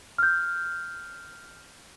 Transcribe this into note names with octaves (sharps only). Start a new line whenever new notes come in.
F6 G6